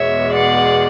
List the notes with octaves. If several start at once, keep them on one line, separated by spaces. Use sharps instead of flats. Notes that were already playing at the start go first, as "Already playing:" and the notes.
Already playing: E2 B2 G#3 C#5 E5
D5 F#5